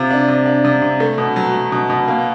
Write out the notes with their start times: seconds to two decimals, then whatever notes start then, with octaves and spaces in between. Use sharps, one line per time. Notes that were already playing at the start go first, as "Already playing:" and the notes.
Already playing: C3 F4
0.11 D4
0.28 C3
0.46 D4
0.65 C3
0.82 C3
1.00 A3
1.18 B2
1.36 F#3
1.54 F#3
1.72 B2
1.90 B2
2.08 A#3